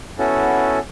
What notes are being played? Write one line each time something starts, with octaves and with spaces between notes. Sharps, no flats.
B3 C#4 E4 F#4 A4